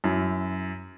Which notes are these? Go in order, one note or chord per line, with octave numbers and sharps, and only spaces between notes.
F#2 E4